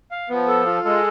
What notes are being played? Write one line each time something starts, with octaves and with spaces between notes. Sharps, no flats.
F5
F3 B3
A4
F4
G#3 A4